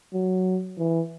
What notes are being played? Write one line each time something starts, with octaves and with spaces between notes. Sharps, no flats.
F#3
E3